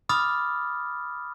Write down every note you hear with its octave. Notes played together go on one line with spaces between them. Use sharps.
B5 D6 D#6 F6 A6